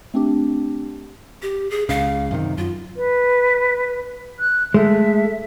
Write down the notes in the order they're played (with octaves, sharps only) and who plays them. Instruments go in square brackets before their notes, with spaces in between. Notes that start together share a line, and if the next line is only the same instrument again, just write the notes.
[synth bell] A3 C4 D4 G4
[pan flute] G4
G#4
[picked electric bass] C#2 C#3 [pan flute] F5
[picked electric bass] F#2 C3 D#3
[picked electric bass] F#2 [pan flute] F4
[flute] B4
F#6
[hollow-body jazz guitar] G#3 A3 [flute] E5